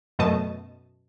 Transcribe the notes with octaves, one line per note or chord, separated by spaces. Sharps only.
F#2 B2 A3 D#5 A5